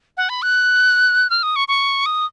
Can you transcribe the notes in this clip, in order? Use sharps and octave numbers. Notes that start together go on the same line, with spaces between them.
F#5
B5
F#6
F6
D#6
C#6
C#6
D#6